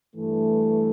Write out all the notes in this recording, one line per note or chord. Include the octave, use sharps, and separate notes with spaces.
G2 E3 A3